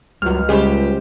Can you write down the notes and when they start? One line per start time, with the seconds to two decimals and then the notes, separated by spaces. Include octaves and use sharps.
0.22 C#2 G2 F#3 F6
0.49 C#3 G3 G#3 G4 C5